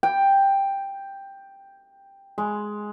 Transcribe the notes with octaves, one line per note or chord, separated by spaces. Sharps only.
G5
G#3